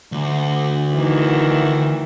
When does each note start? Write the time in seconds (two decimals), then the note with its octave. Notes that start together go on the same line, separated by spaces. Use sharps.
0.12 D2
0.95 D#3 E3